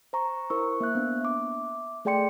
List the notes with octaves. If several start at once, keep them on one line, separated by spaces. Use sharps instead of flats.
C5 A#5 C#6
E4 A#4 C5 C#6 E6
A#3 E5 F#6
B3 D4
E5 D6
A3 G#4 D5 G5 C6 C#7